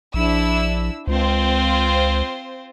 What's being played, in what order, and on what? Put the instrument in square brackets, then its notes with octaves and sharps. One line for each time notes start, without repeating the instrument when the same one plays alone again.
[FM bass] A#1 [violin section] D4 E4 E6
[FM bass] C#2 [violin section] C4 F4 C5